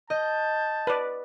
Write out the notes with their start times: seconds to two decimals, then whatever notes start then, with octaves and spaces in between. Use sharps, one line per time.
0.10 D#5 A5 G6
0.87 B4 D5